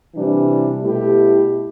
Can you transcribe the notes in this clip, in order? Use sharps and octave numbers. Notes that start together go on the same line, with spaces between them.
C3 E3 G3 D4
B2 A3 E4 G4